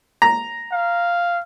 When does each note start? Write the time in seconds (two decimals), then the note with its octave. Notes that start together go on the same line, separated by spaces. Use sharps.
0.22 A#5
0.72 F5